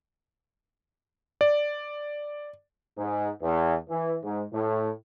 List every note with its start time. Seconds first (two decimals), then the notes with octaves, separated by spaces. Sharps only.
1.41 D5
2.98 G#2
3.42 E2
3.89 E3
4.24 G#2
4.53 A2